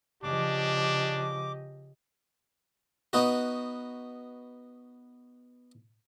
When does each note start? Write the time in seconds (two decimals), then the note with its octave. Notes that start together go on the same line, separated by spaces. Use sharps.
0.24 C#3 F3 D4 G4 D#5 D6
3.13 B3 D#4 F#4